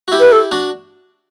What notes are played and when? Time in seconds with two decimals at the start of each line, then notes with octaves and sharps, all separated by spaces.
0.08 F#4
0.12 E4 G4
0.20 B4
0.32 A4
0.51 D4 F#4